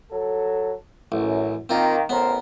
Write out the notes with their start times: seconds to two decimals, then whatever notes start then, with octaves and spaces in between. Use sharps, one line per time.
0.10 F#3 A4
1.12 A1 F#2
1.69 D#3 A#3 C4 F4
2.09 A1 B3 A#4 C5